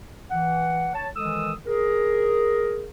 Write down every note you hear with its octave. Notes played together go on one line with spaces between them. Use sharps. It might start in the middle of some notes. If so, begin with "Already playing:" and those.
E3 F#5
C#5 A5
D#3 E3 G#3 A4 D#6 E6
G#4 A#4